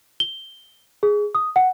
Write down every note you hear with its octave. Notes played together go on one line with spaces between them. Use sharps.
G7
G#4
D#6
F#5